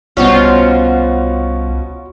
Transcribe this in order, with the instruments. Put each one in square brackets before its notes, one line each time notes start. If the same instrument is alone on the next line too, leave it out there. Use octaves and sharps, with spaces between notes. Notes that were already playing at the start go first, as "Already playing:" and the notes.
[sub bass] C2 [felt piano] B2 G3 B3 [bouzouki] C#4 F#4 C5 [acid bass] F4